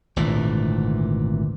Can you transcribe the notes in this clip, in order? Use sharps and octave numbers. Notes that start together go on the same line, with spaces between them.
G#1 D2 A#2 E3